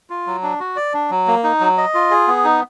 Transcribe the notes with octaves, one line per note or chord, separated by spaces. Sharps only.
F4
F#3
D4
F#4
D5
D4
F#3
A#3
D#4
F#3
D#5
F4
G#4
B3
D#4